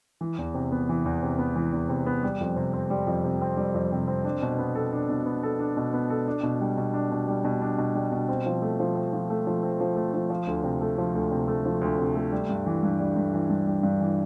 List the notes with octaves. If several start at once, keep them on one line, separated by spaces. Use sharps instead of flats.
E3
E2
C3
B3
E3
E2
C3
B3
E3
E2
C3
B3
G3
F2
C3
C4
G3
F2
C3
C4
G3
F2
C3
C4
D4
B2
B3
A4
D4
B2
B3
A4
D4
B2
B3
A4
D4
B2
G3
B2
D4
B2
G3
B2
D4
B2
G3
B2
C4
F3
A3
F3
C4
F3
A3
F3
C4
F3
A3
F3
F3
D2
C3
A3
F3
D2
C3
A3
F3
D2
C3
A3
G3
G2
E3
G2
G3
G2
E3
G2
G3
G2
E3